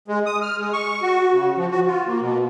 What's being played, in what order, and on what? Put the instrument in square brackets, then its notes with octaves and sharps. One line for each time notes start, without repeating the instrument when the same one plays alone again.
[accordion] G#3
D#6
F6
G#3
C#6
F#4
C#3
F3
F#4
F4
A#3
B2